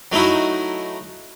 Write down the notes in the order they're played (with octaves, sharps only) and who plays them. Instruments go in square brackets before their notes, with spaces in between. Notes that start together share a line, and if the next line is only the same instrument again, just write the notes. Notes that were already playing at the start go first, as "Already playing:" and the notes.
[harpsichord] F#3 A3 D#4 E4 F#4